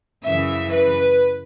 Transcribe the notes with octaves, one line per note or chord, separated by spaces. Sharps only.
F#2 C#3 E3 E5
B4